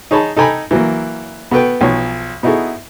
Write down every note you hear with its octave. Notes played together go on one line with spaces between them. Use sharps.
D#4 G#4 C#5 A5 B5
D#4 A4 G5 G#5 A#5 B5
E3 F#3 A#3
B3 F#4 A4 B4 G5
B1 F3 C#5
B3 D#4 E4 F#4 G#4 A4